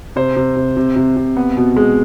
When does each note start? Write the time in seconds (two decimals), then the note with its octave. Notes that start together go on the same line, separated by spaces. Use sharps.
0.16 C3 C5
0.36 C3
0.56 C3
0.77 C3
0.96 C3
1.17 C3
1.37 B3
1.57 B2
1.77 G#3